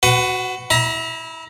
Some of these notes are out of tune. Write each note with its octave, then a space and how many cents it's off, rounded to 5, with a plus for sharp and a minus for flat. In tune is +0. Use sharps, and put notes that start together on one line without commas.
F#4 +0 B4 +25 F#5 +45
E4 -20 A#5 +30